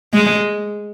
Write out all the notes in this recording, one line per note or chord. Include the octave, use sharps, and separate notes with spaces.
G#3